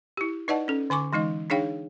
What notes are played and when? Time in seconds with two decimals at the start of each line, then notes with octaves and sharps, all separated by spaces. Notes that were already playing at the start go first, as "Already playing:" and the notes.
0.17 E4 G4
0.48 D#4 B4 D5 D#5 F#5 A5
0.68 C#4 A4
0.90 D3 G#5 C#6 D6
1.13 E3 G#3 D#4 D#5
1.50 D4 D#4 G#4 C#5 F5 G5